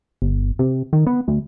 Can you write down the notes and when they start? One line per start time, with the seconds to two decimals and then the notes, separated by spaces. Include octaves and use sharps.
0.22 G1
0.59 C3
0.93 D#3
1.07 B3
1.28 D2